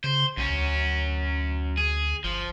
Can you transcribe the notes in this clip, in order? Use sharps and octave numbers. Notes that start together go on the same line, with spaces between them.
C#3 C5
B1 F#2 C#4
D2
G#4
G1 F3